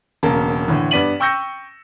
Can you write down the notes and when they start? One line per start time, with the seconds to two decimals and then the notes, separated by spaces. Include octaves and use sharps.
0.23 E1 C#3 A#3 A5
0.68 A2 D3 E3
0.91 G2 B3 D5 B6 D#7 F#7
1.20 G5 C#6 E6 G6 A#6 C#7